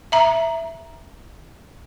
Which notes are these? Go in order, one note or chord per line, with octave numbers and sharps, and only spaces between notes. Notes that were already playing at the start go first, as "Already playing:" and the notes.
E5 A#5